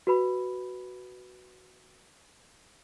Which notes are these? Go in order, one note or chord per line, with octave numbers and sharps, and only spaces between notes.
F#4 B4 B5